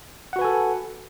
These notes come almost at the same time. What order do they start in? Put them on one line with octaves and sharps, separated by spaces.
F#5 F#4 B4 G#5 A4